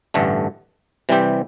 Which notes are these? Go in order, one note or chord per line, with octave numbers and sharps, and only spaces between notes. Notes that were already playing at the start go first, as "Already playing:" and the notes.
A1 G2 D3 A3
C3 E3 G3 C4 G4